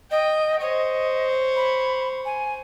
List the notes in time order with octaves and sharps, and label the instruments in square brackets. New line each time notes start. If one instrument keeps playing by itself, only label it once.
[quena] D#5 [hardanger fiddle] G5
[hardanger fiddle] C5 C#5 [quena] D#5
[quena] B5
G#5